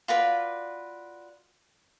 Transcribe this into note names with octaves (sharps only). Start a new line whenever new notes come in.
F4 F#4 B4 D5